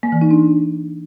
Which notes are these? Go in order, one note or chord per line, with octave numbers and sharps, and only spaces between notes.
A#3
E3
D#4
D4